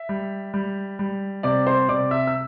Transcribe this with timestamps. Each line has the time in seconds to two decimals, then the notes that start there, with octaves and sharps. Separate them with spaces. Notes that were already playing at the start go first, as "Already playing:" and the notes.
Already playing: E5
0.09 G3
0.54 G3
0.99 G3
1.43 C3 D5 D6
1.67 C5 C6
1.89 C3 D5 D6
2.11 E5 E6
2.27 E6